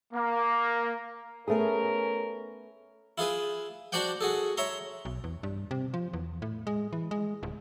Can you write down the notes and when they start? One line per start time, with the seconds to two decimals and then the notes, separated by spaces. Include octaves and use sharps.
0.13 A#3
1.48 A3 B3 C#4 G#4 A#4
3.18 E4 F4 G#4 B4
3.92 D4 F#4 C5 D5 F#5 G5
4.21 F#4 G#4 A4
4.57 C#5 E5 A#5 C6
5.05 B1
5.24 E2
5.43 G2
5.71 C3
5.94 F3
6.13 E2
6.42 A2
6.67 G#3
6.93 E3
7.11 G#3
7.43 D1